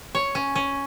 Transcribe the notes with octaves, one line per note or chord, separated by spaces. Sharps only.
C#5
C#4
C#4